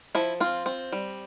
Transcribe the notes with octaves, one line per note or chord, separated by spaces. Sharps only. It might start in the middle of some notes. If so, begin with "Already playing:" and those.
F3 E4
C4 F4
C4
G3